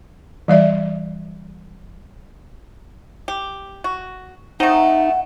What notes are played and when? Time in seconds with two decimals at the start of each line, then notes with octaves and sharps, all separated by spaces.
0.48 E3 G3 D5 E5
3.28 G4
3.84 F#4
4.60 A3 C4 D#4 F#5